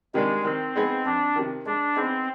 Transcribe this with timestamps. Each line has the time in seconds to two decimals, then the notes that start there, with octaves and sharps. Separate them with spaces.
0.14 C3 D#3 G3 G#3 D4
0.45 D#3 C4
0.75 G#3 B3 D#4 G#4
1.05 F2 D4
1.36 C3 D#3
1.66 G#3 D4
1.96 B3 C4 D#4 G#4